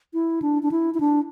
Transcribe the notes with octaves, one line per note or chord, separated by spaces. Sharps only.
E4
D4
D4
E4
E4
D4